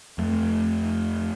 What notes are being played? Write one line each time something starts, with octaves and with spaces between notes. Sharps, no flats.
F2 A3